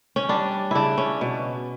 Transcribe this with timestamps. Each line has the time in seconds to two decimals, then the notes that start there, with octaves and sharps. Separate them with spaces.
0.16 C#4
0.29 G3 D4
0.71 C#3 D4 E4
0.98 C#4
1.21 B2